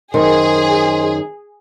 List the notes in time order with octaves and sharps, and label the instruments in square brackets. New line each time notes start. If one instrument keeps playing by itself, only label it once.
[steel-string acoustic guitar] F#2 D#3 [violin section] G#4 [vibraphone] C5 D#5 C6